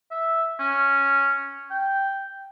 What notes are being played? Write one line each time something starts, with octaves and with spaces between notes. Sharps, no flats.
E5
C#4
G5